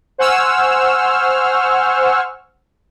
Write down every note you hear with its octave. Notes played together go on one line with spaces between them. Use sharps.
C5 F#5 G#5 C#6 E6 F6